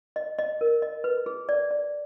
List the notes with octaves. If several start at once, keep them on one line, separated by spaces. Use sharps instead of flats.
D#5
D#5
A#4
D#5
B4
G#4
D5
D5